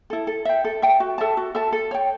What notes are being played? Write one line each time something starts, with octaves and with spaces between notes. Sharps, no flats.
E4 A4
A4
E5 G5
A4
E5 G5
F#4
A4 E5 A5
F#4
A4 E5 A5
A4
C#5 G5